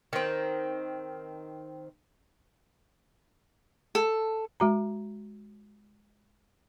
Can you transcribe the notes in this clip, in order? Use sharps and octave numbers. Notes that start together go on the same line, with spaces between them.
D#3 C4
A4
G#3 F#4 A#5